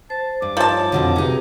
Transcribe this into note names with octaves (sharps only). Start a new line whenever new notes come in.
C5 A5
G2 D6
F3 D#4 C#5 F5 A5
F2 B2 D3
C3 D#4 G#4 B4